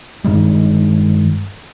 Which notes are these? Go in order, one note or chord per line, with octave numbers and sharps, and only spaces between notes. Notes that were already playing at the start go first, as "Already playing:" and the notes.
G2 D#3 G3 G#3